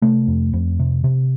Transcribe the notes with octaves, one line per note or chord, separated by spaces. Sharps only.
C3 A3
F2
F2
C3
C3